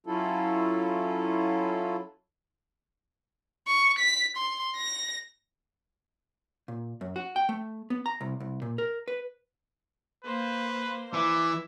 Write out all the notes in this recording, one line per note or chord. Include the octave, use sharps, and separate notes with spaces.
F#3 C#4 E4 F4 A4
C#6
B6
C6
A#6
A#2
F#2
F#4
G5
A3
B3
A#5
C2
C2
A#2
A#4
B4
A#3 B4 C5
E3 D5 E5